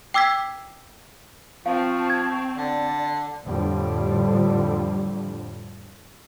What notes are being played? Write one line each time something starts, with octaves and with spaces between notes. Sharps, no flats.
G5 D6 E6 G#6 B6
F3 C4 F5 A5 C#6
G#6
D3 D5
F2 A2 D3 F3 G3